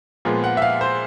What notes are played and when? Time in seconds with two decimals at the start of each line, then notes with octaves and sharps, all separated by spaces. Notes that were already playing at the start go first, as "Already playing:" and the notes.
0.25 A#2 F3 G#3 B3
0.44 F#5
0.57 E5
0.62 F5
0.81 C5